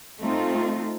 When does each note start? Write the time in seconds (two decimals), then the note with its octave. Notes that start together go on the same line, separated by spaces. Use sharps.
0.20 A3 C4 D#4 F4